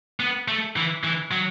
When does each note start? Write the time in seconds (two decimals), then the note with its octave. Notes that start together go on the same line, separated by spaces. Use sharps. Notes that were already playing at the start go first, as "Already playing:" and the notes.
0.20 B3
0.48 A3
0.76 E3
1.04 E3
1.31 F#3